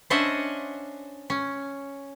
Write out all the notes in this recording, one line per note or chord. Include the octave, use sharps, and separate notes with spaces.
C#4 D4 C5 D#5 E5 F#5
C#4